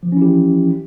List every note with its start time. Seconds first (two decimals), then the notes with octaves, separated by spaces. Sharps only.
0.03 F3
0.07 E3
0.12 C#4
0.17 E4
0.22 G4